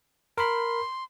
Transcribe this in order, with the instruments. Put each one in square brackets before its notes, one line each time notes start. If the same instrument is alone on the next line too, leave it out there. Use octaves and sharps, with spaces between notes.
[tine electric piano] A#4 B5 [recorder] C6